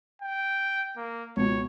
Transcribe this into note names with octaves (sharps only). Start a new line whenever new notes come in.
G5
A#3
C#2 B2 C#5